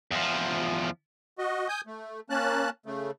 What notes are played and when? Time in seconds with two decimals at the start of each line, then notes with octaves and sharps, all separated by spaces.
0.11 E2 F3
1.38 F#4 D#5
1.68 G#5 D#6 G6
1.87 A3
2.30 A#3 C#4 A5 F#6
2.86 C#3 A3